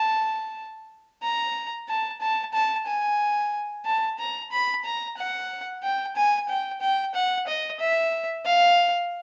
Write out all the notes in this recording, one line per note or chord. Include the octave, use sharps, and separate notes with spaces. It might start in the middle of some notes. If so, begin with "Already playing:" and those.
Already playing: A5
A#5
A5
A5
A5
G#5
A5
A#5
B5
A#5
F#5
G5
G#5
G5
G5
F#5
D#5
E5
F5